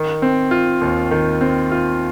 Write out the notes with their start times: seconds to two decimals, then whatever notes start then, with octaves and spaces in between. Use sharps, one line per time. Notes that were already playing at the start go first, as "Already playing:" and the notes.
Already playing: D#3
0.22 C4
0.51 F4
0.81 D#2
1.11 D#3
1.41 C4
1.71 F4